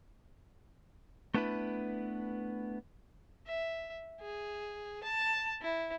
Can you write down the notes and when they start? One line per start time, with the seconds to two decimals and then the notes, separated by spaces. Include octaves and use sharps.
1.34 A3 B3 D4 E4 B4
3.47 E5
4.21 G#4
5.04 A5
5.62 E4